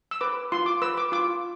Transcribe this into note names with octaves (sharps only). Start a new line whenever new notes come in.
E6
B4 D6
F4 C6
D6
B4 E6
D6
F4 D6